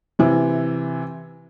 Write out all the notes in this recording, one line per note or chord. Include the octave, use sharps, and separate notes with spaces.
C3 E3